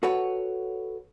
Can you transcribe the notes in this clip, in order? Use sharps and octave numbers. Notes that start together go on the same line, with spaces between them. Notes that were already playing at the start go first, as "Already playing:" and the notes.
F#4 A4 B4 C#5 F#5